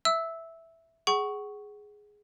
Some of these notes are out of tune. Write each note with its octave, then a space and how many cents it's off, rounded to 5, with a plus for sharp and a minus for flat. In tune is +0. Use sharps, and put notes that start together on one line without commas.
E5 +0 E6 -10
G#4 +0 F#5 +25 C#6 +0